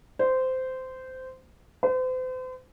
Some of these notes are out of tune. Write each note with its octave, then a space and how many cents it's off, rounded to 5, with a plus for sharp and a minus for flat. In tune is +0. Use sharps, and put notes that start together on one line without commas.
C5 -15
C5 -40